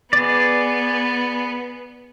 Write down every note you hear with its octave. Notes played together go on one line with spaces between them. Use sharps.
B3 G#4 D5